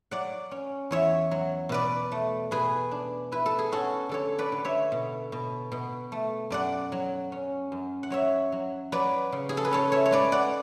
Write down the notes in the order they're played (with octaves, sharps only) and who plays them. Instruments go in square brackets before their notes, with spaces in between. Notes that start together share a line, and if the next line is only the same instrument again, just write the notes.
[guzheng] F#3 D5 F#5
C#4
E2 C#5 E5
F#3
B2 B4 D5
A3
B2 G#4 B4
D4
E4 B4
A4
G#4
C#4 F#4 A4
D3 A4 C#5
B4 D5
D3
C#5 E5
B2
B2
B2
A3
F#2 D5 F#5
F#3
C#4
F#2
F#5
F#3 C#5 E5
F#3
F#3 B4 D5
C#3
G#4
A4
B4
C#4 A4 C#5
C#5 E5
C#5
G#3 B4 D5
D5 F#5